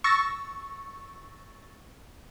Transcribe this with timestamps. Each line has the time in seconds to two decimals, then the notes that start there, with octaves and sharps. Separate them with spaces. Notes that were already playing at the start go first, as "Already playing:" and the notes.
0.04 C#6 E6 A6 A#6